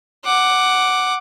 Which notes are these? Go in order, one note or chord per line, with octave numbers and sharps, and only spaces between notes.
F#5 D6